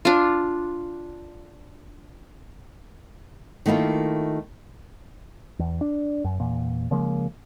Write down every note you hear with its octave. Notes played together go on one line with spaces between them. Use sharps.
D4 F4
D#3 A3 A#3 E4 F4
E2
D4
F#2
E2 A#2
C#3 F3 G#3 A#3